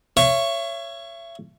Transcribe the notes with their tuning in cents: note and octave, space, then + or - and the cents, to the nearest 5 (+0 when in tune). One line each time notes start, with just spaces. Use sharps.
C#5 +0 E5 +35 C#6 +0